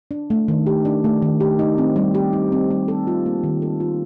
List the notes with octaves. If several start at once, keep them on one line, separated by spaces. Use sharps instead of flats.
D4
A3
D#3
G4
D4
A3
D#3
G4
D#4
C4
G3
G4
D#4
C4
G3
A4
F4
A#3
D#3
A4
F4